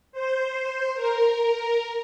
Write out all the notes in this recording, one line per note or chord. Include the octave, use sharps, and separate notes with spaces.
C5
A#4